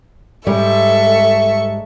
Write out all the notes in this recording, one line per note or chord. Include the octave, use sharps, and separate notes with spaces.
G#2 G3 G#3 A4 E5 C#6